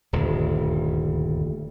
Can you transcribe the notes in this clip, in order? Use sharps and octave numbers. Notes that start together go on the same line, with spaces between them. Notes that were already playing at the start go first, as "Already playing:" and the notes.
D#1 D2 G2